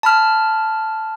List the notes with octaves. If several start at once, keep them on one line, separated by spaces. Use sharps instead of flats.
A5 B5 F6